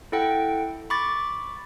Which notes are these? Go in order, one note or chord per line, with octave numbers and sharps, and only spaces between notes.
E4 A4 F#5 G5
B5 C#6 D6 A6